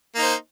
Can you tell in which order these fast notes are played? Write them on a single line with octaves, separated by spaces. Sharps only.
A#3 D#4 C5